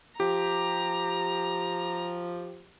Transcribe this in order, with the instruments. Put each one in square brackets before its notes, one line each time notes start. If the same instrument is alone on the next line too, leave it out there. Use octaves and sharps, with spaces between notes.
[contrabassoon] F3 [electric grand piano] G4 [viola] A#5